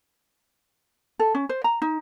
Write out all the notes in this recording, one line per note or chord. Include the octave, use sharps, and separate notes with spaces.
A4
C#4
C5
A#5
D#4